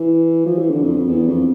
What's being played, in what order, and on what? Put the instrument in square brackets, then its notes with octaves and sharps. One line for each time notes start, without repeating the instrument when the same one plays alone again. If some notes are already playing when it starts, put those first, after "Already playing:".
Already playing: [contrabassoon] E3
F3
E3
D3
F2
F2
E2
F2